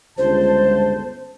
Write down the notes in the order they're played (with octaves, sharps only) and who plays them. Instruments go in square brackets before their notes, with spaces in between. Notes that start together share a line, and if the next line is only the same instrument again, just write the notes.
[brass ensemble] G1 C#2 A5 [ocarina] C5